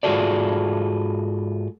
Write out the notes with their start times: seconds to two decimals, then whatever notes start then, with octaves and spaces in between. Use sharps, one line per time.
0.03 G#2 F4 F#4 G#4 A4 D5